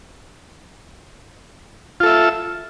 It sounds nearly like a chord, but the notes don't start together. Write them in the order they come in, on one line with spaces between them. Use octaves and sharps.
F4 A4 E5